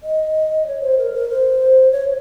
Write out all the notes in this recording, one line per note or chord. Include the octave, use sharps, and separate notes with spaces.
D#5
C#5
C5
A#4
A#4
C5
C#5